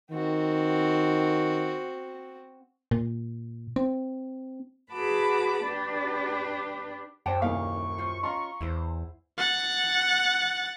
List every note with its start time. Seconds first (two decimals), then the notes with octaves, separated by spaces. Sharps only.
0.11 D#3 C4 F#4
2.91 A#2
3.76 C4
4.92 F#4 G#4 B4 A5 B5 D6
5.64 D4 G4 B4
7.26 F#2 C5 F#5 G5 A5 D6
7.42 D#1 C2 A#3 C#4 D#4 F5 C#6
7.98 F4 C5
8.23 C#4 F4 D#5 F5 A#5 C6
8.61 E2 E4 C5
9.38 F#5 A6